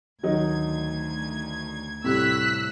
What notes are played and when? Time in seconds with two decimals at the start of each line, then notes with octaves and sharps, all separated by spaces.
0.23 D2 D#3 F#3 D#4 G#6
2.04 A2 C3 G3 E6 F#6 B6